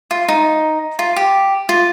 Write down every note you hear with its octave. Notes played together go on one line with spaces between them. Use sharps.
F4
D#4
F4
G4
F4